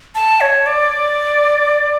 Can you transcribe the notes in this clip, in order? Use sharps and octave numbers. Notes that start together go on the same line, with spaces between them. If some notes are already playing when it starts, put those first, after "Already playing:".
A5
C#5
D5